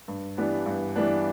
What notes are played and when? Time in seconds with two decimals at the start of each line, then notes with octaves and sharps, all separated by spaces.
0.08 G2
0.37 E3 G3 B3 D4
0.66 G2
0.96 E3 G3 B3 D4